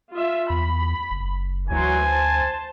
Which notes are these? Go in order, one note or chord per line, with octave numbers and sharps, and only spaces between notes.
F4 E5
E2 B5
F#1
D2 E3 F#3 G#5 C6
C5 A5